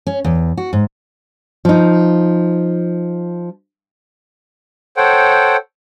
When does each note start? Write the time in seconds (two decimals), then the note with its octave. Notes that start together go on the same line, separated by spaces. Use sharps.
0.07 C#4
0.25 E2
0.58 F#4
0.73 G#2
1.65 F3 D#4
4.97 A4 C5 C#5 F#5 G5